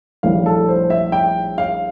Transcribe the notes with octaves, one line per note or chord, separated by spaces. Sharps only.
A#1 A2 G3 F5
A4
C5
E5
G5
F5